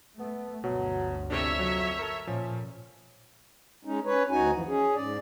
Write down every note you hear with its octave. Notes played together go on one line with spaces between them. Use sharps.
A3 B3
G1 D2 B2 F#3
F2 C3 D4 C#5 E5
F#3 E6
A4 A#4
A#2 F3 C#4
G#3 C#4 D#4
C#4 B4 C#5
D2 D#4 F#4 G#5
F#2 E3 F3
C#4 G#4
G#2 D5